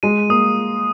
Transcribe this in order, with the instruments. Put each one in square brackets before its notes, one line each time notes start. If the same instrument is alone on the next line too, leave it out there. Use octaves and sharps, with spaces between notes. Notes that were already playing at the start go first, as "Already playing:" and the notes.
[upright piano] G#3 [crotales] D#7
[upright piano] A#3 [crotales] D#6